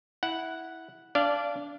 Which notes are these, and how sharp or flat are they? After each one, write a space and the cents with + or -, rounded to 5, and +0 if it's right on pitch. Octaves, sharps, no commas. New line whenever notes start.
E4 -10 F#5 +0
D4 -20 D5 +0 F5 -20